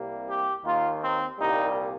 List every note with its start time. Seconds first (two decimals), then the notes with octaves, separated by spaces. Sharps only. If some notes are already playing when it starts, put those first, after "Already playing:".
Already playing: C2 C3 G3 A#3
0.28 G4
0.65 D#2 D#3 A#3 F4
1.01 C4
1.39 C2 A#2 G3 A#3 D#4